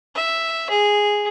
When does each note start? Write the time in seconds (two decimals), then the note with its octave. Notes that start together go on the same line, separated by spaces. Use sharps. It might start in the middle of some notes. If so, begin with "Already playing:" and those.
0.15 E5
0.70 G#4